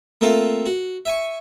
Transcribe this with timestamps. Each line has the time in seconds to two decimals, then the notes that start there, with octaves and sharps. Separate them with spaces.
0.21 A3 A#3 C4 F4 A4
0.66 F#4
1.05 E5 G#5 C#6